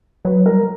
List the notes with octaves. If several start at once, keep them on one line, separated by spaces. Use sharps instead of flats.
F#3 B4
G3 A#4